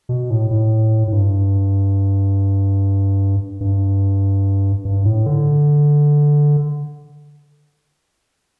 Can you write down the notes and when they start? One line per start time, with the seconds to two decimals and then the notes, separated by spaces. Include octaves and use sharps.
0.09 B2
0.30 A2
0.51 A2
1.08 A2
1.13 G2
3.61 G2
4.85 G2
5.05 A2
5.26 D3